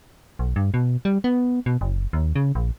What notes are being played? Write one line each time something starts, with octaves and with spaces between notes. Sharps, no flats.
B1
G2
B2
G3
B3
B2
F#1
D#2
C#3
A#1